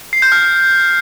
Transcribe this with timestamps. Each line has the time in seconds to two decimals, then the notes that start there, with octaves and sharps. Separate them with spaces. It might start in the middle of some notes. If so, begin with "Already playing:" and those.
0.13 C7
0.22 G6
0.32 F6